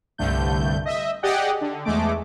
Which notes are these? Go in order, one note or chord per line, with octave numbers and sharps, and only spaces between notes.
C2 G2 D3 A3 G6
D#5 E5
G4 G#4 D5 D#5 F#5 G5
D3
E2 G#3 A3 D6